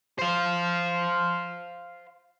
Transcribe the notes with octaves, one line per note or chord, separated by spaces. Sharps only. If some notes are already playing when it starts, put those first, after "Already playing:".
C5 F5